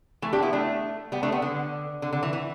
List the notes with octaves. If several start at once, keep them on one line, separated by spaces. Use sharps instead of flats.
E3 A3
D4 G4
B3 E4
A3 D4
G3 B3
A3 D4
G3 B3
D3
D3
D3
E3
E3